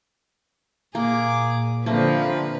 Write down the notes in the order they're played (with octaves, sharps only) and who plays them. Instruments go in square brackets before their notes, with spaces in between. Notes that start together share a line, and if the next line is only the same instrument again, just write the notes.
[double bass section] A#2 [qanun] A#3 [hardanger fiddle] G#4 D6
[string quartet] D3 F3 C4 [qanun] A3 A#3 [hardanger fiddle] B4